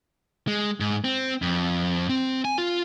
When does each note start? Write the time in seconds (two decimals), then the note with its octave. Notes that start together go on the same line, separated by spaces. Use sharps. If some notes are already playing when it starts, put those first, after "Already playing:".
0.48 G#3
0.80 G#2
1.04 C4
1.42 F2
2.09 C4
2.45 G#5
2.58 F4